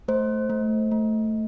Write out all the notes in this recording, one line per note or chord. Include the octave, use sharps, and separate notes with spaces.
A3 C5
A3
A3